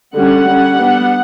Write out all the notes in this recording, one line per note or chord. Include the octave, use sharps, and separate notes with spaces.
D3 G3 C#4 F#5
G3 C#4
G3 B3 D4